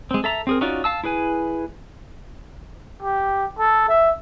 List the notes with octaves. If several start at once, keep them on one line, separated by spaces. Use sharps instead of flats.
G#3 C4
A4 E5 A#5
C4 G#4 A#4
C#4 D#4 F4 F#4 D5
F5 A5 E6
E4 G#4 B4 G#5
G4
A4
E5